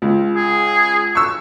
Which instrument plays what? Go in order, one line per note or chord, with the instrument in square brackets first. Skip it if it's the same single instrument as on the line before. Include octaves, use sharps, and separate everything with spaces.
[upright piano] C#2
[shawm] G#4
[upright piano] C#6 E6